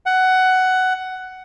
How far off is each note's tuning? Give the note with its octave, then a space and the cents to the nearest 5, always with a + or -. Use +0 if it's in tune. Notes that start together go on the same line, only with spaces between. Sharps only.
F#5 +10